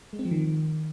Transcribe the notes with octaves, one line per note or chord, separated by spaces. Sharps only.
G#3
C4
F3
D#3